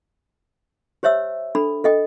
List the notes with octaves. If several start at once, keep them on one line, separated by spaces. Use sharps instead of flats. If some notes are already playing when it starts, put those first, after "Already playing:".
G4 C5 C#5 E5 E6
D4 A4 B5
A4 D#5 G5